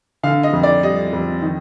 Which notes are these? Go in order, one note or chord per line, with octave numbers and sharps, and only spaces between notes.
D3 F5
D#5
F2
D5
G3 D#5
F2
D#3